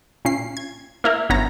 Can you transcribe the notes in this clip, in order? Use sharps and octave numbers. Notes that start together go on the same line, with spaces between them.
A#2 C#4 C7
G#6
A#3 E4 A#4
G1 B3 C#4 A#5